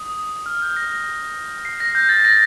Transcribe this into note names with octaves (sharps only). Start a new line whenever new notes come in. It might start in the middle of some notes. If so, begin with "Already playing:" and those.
Already playing: D#6
F6
G6
A#6
C7
A#6
G6
A6
A#6